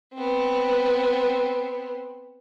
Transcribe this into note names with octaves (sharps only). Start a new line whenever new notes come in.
B3 C4